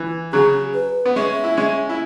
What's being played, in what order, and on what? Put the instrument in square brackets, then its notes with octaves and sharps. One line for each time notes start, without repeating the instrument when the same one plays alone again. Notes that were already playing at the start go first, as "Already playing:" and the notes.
Already playing: [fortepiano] E3
[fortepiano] C#3 F#3 [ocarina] G#4
[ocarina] B4
[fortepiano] B3
[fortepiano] G#3 C#4 [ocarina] E5
[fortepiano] E4
G#3 C#4
E4